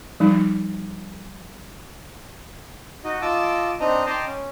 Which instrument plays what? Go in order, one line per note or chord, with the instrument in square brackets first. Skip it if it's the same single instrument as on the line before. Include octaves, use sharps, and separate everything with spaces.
[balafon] F3 G3 D#4
[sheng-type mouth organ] D#4 F#4 D#5
F4 D#5 A5 D6 E6
C4 D4 D#4 D#5 A#5
D#5 G5 A5 A#5 C6 D6
C#4